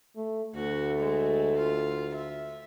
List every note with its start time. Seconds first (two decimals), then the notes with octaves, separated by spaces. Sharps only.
0.16 A3
0.55 D2 A3 F#4
0.98 G#3
1.57 F4
2.15 E5